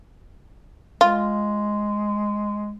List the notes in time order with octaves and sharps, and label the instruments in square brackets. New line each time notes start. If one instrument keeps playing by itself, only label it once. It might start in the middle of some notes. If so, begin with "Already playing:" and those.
[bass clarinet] G#3 [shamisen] F4